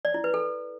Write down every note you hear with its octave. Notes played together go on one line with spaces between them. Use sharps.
D5
E4
B4
A4